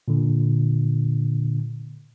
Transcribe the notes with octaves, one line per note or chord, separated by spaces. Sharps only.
A#2 D3